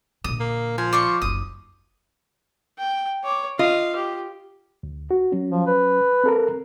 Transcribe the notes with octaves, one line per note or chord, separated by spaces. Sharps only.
A#1 D3 D#6
A#3
F3 G#5
D5 C6 C#6
F#1 D#4 D#6
G5
C#5 D6
F4 D#5 F5
G4
D2
F#4
F#3 C#4
F3
B4
C4 A4 A#4